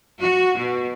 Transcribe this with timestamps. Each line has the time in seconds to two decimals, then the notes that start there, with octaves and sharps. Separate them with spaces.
0.19 F#4
0.56 B2